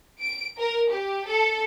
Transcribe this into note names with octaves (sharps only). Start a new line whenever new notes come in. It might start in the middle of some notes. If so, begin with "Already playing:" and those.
D7
A#4
G4
A4